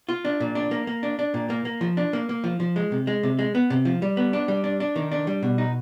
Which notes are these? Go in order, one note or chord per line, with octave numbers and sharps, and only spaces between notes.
F4
D4
A#2
D4
A#3
A#3
D4
D4
A#2
A#3
A#3
F3
D4
A#3
A#3
F3
F3
G#3
C3
G#3
C3
G#3
B3
C3
F3
G3
B3
D4
G3
D4
D4
D#3
D4
G3
B2
D#4